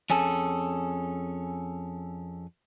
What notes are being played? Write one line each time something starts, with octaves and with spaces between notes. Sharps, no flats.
F2 C#4 G#4 A4